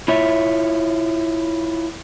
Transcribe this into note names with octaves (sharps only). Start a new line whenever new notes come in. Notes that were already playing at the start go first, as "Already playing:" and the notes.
E4 F4 C#5 E5